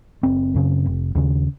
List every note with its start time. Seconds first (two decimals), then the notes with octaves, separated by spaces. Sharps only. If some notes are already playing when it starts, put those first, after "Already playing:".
0.23 F#1 C4
0.55 F#2 C#3
0.86 F1
1.15 D#2 C#3